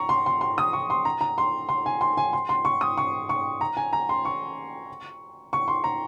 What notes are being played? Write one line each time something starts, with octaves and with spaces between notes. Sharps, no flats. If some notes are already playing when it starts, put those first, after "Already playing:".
Already playing: A#5 C#6
C6
C6
C6
D#6
C#6
C6
A#5
A#5
C6
C6
G#5
C6
G#5
C6
C6
C#6
D#6
C#6
C#6
A#5
G#5
A#5
C6
C#6
C#6
C6
A#5